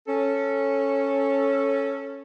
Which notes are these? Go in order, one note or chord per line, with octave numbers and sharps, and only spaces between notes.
C#4 A4